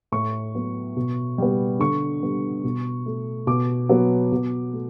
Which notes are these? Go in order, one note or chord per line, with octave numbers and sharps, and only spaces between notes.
A2 C#6
F#3 B3
B2
G3 B3
D3 C#6
G3 B3
B2
A3
B2 D6
F#3 B3
B2
A3